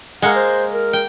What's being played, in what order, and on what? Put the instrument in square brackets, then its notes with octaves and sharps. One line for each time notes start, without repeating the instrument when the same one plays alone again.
[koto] G#3 A#3 [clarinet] F#5
[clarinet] C5
A#4
[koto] G5